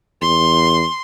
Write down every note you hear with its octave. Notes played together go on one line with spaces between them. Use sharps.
E2 C6